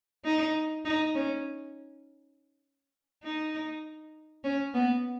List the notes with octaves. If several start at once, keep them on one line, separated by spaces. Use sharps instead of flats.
D#4
D#4
C#4
D#4
C#4
B3